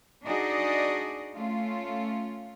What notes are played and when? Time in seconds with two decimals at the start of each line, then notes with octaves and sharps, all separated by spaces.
0.24 D4 D#4 F#4 G#4 D5 D#5
1.36 A3 C#4 F4